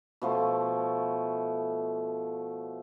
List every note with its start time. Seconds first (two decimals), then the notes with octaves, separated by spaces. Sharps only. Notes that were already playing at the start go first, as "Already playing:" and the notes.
0.22 B2 F3 A3 C#6